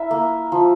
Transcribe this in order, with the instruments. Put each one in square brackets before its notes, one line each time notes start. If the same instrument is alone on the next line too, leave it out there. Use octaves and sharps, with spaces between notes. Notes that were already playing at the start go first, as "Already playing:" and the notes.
Already playing: [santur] E4 A#4 E5
A#3
F3